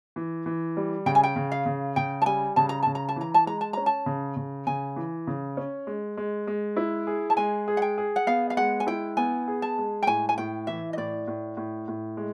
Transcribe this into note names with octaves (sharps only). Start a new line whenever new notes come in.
E3
E3
G3
C#3 G5
G#5
G5
C#3
F5
C#3
C#3 G5
A5
G3 G#5
C#3 A5
A#5
C#3 A5
A#5
A5
E3 A#5
A5
G#3 A#5
A5
C#4 A#5
A5
C#3
C#3
C#3 G#5
E3
C#3
C#4
G#3
G#3
G#3
E4
G#4
A5
G#3 G#5
G#4
F#5
G5
G#4
F#5
B3 F5
F5
G#3 F#5
G#5
E4 G5
B3 G#5
G#4
A5
G#3
G5
A2 G#5
G#5
A2 G5
E3 E5
D#5
A2 D5
A2
A2
A2
G#3